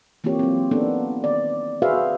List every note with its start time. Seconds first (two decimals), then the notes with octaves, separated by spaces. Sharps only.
0.24 E3 A#3 C4 F4 G4 C#5
0.39 F#3 C4
0.71 A#3 B3 D4 D#4 A4
1.24 D#3 D5
1.82 F#4 G#4 B4 C5 E5 F5